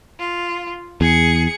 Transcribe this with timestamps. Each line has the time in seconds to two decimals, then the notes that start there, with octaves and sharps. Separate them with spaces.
0.19 F4
1.01 E2 G#4 C#7